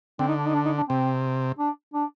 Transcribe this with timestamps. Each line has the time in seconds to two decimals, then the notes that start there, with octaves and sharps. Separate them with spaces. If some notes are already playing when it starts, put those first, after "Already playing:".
0.19 D3 C4
0.28 D#4
0.38 D4
0.46 D#4
0.54 D4
0.66 D#4
0.78 D4
0.89 C3 C4
1.59 D4
1.94 D4